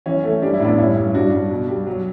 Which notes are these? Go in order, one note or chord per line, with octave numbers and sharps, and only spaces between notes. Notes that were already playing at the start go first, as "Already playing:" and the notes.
E3 C#4
A3
G3 D4
E4
A2 B3 D4
G2 C#4 E4
G2
G2 D4 F#4
G2
B2
G3
F#3